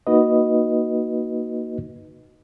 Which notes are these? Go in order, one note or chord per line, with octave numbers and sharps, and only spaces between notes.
A#3 D#4 F#4 B4 D#5